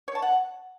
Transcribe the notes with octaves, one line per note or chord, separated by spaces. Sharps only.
C#5
A5
F#5